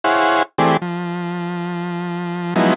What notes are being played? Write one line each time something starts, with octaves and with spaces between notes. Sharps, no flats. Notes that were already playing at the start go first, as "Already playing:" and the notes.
E4 G#4 C5 C#5 F5 F#5
E3 A3 C4 G4 G#4 D5
F3
F3 F#3 G#3 B3 D#4 E4